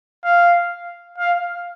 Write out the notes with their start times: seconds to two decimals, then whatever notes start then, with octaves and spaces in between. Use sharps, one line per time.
0.25 F5
1.18 F5